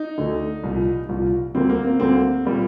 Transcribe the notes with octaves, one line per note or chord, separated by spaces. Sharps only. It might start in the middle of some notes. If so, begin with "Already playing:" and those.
Already playing: D#4
D2 D3 A3
C2 A#2 F3
C2 A#2 F3
D2 D3 G3 A#3 C4
A#3
C4
D2 D3 G3 A#3 C4
A#2 G3 A#3